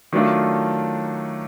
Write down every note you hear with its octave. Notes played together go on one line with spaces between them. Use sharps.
D#3 F#3 A3 D4 F4